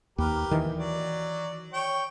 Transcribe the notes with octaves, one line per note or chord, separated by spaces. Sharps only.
D#2 G4 A#4 B4
D#3 E3
F#3 D5
C#5 G5